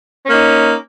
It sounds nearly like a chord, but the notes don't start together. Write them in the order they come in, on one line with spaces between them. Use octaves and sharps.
C#4 A#3 D#4